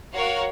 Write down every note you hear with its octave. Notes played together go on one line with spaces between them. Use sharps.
F#4 A#4 C#5 F5